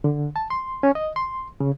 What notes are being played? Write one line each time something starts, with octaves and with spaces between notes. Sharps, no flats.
D3
A5
C6
C#4
D#5
C6
C#3